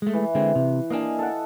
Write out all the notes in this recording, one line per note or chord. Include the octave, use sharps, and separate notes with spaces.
G#3 A3
E3
D3 G#3 C4
C3 E3
A#3 D4 D#5 F5 G#5
A4 F#5